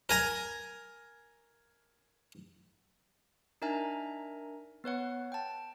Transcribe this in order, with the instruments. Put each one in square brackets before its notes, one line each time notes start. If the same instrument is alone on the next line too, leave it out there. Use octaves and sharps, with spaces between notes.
[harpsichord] A#4 G#5 A#5
[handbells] D4 D#4 A#4 E5 G#5 A#5
B3 B4 C#5 F#5
G5 A5